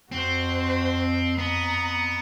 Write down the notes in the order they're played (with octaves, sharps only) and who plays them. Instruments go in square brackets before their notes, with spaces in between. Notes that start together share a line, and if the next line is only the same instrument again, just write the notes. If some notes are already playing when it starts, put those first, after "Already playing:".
[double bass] F2 [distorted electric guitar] C4 [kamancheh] F#4 C5
[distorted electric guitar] B3 [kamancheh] A#5 D#6